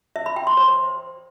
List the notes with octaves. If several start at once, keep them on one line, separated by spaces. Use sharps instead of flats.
E5
B5
G5
C6
C5